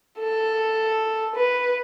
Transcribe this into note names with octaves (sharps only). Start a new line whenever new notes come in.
A4
B4